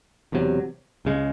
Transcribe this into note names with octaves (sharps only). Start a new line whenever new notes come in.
E1 E2 C3 F#3
C#2 C#3 G#3